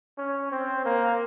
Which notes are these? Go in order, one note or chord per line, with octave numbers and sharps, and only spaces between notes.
C#4
C4
A#3